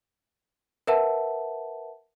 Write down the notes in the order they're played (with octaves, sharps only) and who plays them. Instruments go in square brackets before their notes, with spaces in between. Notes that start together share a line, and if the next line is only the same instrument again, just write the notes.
[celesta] A#4 B4 E5 F#5 A5